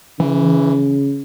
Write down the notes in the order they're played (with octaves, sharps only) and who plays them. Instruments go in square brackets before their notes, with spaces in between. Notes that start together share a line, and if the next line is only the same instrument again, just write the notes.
[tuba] C#3 [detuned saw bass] E3